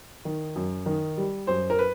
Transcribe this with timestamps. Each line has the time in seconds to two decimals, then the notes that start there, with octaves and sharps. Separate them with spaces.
0.25 D#3
0.55 F#2
0.86 D#3
1.17 G3
1.47 F#2 C5
1.70 A#4
1.79 B4